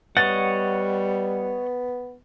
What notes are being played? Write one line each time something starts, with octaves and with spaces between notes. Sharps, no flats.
G3 B3 C#5 D#5 F#5 A6